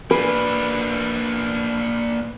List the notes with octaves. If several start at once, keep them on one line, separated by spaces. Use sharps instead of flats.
A#3 D4 B4